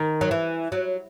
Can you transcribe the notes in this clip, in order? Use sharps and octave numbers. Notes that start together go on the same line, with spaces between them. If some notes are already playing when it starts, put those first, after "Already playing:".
Already playing: D#3
F#3
E3
F#3